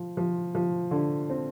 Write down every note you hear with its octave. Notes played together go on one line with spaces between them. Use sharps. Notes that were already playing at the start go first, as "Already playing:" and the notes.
Already playing: F3
F3
F3
D3
C4